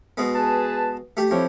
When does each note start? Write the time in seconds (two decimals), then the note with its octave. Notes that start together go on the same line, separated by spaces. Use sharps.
0.17 B2 G#3 B3
0.35 G#4 B4 A5
1.17 A3 G4
1.31 F2 E4 G4 C#5